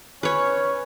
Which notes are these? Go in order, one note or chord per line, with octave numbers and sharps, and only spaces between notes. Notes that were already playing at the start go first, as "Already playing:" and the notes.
C#4 B4 C#5